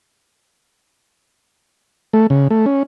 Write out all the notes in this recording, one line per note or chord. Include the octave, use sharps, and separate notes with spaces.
A3
C#3
A3
C#4